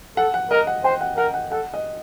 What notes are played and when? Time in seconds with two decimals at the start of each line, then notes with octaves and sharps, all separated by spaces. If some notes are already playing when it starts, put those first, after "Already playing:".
0.17 A4 F#5
0.34 F#5
0.51 A#4 D#5
0.67 F#5
0.84 C5 G5
1.01 F#5
1.17 A#4 F#5
1.34 F#5
1.51 A4 F#5
1.74 D#5